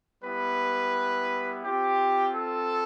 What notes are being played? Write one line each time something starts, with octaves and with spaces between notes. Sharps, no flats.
G3 B3 E4 B4
C4 F4 G4
A4